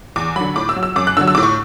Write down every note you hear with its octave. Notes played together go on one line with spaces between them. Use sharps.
E2 D6
D3 F#3 B5
A2 D6
E6
F#3
E6
F#2 D6
F#6
D3 F#3 E6
E6
A2 D6
C#6